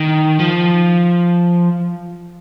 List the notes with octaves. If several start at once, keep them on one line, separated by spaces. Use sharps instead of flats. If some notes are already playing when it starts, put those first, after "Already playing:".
Already playing: D#3
F3